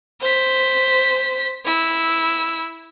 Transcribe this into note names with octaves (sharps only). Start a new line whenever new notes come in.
C5 B6
E4 E6